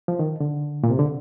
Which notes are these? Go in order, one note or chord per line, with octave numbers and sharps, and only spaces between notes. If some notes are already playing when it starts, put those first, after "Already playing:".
F3
D#3
D3
A#2
C3
D3